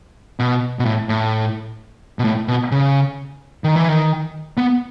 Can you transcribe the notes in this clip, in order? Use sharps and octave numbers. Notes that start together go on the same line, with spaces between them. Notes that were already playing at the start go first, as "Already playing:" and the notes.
B2
B2
A2
A2
B2
A2
B2
C#3
D#3
E3
D#3
B3